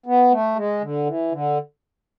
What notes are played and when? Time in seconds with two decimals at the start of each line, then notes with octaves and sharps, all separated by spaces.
0.06 B3
0.31 A3
0.56 G#3
0.81 D3
1.06 E3
1.32 D3